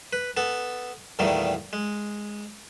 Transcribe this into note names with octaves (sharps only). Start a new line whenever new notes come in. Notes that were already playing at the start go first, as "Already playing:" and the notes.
B4
B3 A4
E2 A#2 D#3 G3 A3
G#3